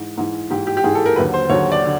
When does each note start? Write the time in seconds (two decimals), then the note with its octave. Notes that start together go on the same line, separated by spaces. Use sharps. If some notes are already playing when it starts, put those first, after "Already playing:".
Already playing: G#2 E3
0.17 G#2 E3
0.50 G#2 E3 G4
0.67 G4
0.77 G4
0.84 G#2 E3 G#4
0.95 A4
1.06 A#4
1.16 D#2 D3 F#3 B4
1.34 C5
1.49 D#2 D3 F#3 C#5
1.72 D5
1.84 D3